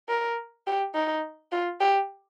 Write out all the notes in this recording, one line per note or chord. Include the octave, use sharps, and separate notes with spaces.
A#4
G4
D#4
F4
G4